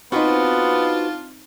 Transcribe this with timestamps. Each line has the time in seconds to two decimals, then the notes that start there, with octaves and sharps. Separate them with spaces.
0.12 B3 C4 D4 D#4 F4 F#4 B4 C5